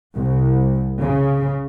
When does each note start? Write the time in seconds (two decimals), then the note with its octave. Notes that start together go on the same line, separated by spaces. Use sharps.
0.14 C2
1.01 C#3